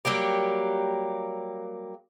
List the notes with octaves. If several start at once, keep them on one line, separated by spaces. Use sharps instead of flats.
F#3 G3 A#3 G4